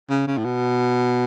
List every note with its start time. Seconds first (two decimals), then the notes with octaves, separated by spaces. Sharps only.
0.10 C#3
0.27 C#3
0.38 A2
0.45 B2